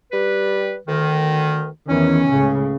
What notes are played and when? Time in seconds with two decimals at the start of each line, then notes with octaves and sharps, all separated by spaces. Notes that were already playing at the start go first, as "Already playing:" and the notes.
0.11 G3 B4
0.87 D2 D#3
1.88 E2 D#3 E3 C#4
2.29 C#2 A2 C#3